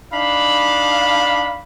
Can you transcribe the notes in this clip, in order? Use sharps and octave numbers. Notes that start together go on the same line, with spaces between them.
D4 D#4 F5 B5